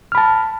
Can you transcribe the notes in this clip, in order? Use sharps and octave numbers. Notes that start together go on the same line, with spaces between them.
A5 B5 F6